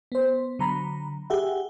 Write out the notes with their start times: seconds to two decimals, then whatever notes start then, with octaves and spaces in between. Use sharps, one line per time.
0.12 B3 C5
0.59 D3 F#3 A#5 B5
1.30 G4 G#4 E5 F#5